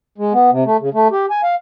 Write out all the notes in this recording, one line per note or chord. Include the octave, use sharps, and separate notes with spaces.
G#3
B3
C3
A3
C#3
A3
G4
G#5
F5